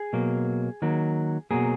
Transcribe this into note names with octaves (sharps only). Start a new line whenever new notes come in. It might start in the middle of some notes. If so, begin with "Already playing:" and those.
Already playing: G#4
B2 F#3 A#3
D#3 F#3 A#3
B2 F#3 A#3 G#4